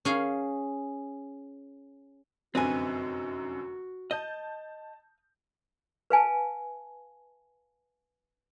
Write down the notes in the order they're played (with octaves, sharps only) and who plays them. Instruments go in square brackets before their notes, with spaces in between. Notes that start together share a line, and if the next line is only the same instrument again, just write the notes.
[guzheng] C#4 G#4 F5
[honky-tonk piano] F1 F#2 D3 [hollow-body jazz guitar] C4 D#4 [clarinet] F#4 [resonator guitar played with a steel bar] B4 G#5
[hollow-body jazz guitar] D#5 [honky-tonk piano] A5 G6
[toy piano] B4 F5 G#5 A5